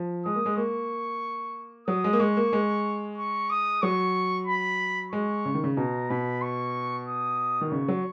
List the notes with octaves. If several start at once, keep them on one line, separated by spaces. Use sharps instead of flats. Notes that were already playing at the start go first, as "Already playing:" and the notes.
Already playing: F3
G#3 D#6
A#3
G#3
A#3 C#6
F#3 D#6
G#3
A#3
G#3 C#6
A#3
G#3
C#6
D#6
F#3 C#6
B5
G#3 C#6
C#3
D#3
C#3
B2 A#5
B2 B5
C#6
D#6
D#3
C#3 C#6
F#3